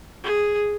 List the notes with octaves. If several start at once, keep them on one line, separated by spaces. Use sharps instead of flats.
G#4